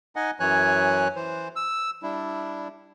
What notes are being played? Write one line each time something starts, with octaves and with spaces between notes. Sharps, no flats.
D#4 D#5 F#5 G#5
F#2 E3 F#3 C#5 G#5 F#6
E3 C5
E6
G3 D4 E4